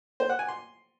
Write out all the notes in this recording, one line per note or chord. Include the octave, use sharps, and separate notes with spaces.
C5
F#5
G#5
C6